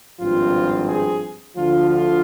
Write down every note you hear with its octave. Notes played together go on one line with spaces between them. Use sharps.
G#1 G2 F3 C4 F4
G#4
D2 D3 F3 F4
F4